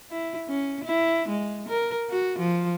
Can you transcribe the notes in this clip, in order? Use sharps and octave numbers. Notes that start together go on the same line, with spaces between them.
E4
C#4
E4
G#3
A#4
F#4
F3